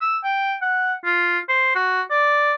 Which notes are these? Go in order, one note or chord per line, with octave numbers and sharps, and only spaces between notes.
E6
G5
F#5
F4
C5
F#4
D5